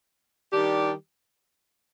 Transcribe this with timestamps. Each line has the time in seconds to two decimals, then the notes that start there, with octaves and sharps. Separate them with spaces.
0.51 D#3 G3 D4 G4